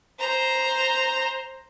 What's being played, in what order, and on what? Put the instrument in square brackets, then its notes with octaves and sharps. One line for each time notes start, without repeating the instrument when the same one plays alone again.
[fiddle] C5 A#5